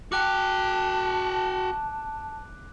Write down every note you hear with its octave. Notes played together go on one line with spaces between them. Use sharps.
F#4 G5 A5 D6 F#6 D7